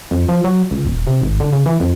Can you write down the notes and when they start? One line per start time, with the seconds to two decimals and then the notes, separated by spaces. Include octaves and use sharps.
0.11 F2
0.29 F3
0.44 F#3
0.71 C#2
0.87 D#1
1.07 C3
1.22 G#1
1.40 D3
1.53 C#3
1.66 E3
1.80 F2